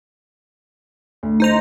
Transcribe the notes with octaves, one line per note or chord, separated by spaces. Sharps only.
D2
D#4 C5 A#5